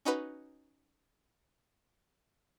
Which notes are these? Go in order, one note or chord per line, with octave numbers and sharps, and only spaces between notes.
C#4 D#4 F#4 B4